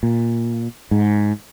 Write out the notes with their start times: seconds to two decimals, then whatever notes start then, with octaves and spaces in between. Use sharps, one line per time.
0.03 A#2
0.91 G#2